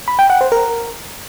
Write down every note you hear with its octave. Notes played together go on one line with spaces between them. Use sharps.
B5
G5
F#5
C5
A#4